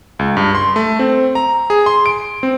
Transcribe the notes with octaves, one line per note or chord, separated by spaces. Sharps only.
C#2
G2
C6
A3
C4
A#5
G#4
C6
D7
C4